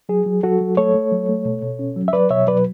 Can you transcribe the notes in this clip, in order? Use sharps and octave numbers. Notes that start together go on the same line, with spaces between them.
F#3 G#4
F#3
F#3 F#4 A4
F#3
A3 A4 C#5
A3
F#3
A3
B2
B2
C#4
F#3
E5
F#3 B4 D5
B2 C#5 E5
F#3 B4 D5